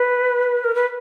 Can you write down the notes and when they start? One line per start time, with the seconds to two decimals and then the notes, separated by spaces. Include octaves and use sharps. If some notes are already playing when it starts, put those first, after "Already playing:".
Already playing: B4
0.64 A#4
0.75 B4